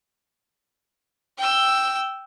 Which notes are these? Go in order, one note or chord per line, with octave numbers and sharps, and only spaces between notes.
G5 E6